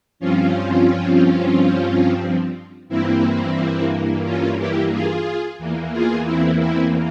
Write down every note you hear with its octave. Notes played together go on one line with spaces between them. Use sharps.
G2 F3 C4 C#4 F4
G2 E3 A#3 C4 E4
C#4 F4
E4 G4
F4 G#4
E2 E3 A#3
F4 G#4
C4 E4
C4 E4